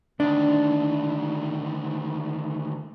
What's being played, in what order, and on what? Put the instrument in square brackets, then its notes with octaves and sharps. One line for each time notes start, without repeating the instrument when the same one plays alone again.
[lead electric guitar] D2 D#3 [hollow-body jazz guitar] D4